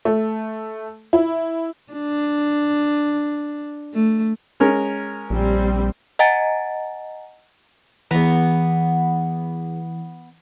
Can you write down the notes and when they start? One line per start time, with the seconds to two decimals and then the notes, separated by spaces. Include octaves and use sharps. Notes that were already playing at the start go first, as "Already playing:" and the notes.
0.05 A3
1.13 E4
1.93 D4
3.94 A3
4.60 G#3 C#4 A#4
5.30 A#1 G3 C4
6.19 D#5 F#5 G#5 A#5 A6 D7
8.11 E2 E3 B3 A#5